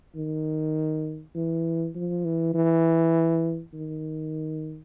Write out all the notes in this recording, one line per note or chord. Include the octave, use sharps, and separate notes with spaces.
D#3
E3
F3
E3
E3
D#3